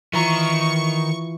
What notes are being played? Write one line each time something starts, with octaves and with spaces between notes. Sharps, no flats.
D#3 E3 F4 A#5 C#6